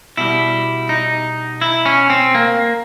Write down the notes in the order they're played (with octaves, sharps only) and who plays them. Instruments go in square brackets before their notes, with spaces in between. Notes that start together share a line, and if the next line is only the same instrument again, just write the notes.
[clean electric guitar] B2 G3 E4
D#4
E4
C#4
C4
A#3